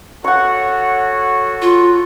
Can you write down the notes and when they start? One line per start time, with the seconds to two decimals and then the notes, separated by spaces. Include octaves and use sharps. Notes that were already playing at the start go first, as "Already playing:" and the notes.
0.24 F#4 A4 C#5 F#5 C#6
1.62 F4